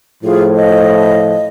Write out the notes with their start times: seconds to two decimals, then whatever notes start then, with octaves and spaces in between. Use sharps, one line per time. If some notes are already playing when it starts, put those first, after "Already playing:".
0.23 A2 F3 F4 G#4
0.55 D#5